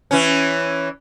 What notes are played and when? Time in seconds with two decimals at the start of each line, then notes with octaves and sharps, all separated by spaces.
0.11 E3 C#4